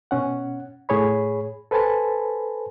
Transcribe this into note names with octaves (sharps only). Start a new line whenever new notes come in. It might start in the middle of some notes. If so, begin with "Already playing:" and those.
B2 C#4 F#5
A2 G#4 C#5 B5
A4 B4 C5 G#5 A5 B5